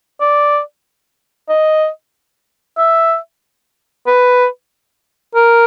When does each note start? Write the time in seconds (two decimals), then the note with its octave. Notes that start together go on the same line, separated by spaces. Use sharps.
0.21 D5
1.49 D#5
2.78 E5
4.07 B4
5.35 A#4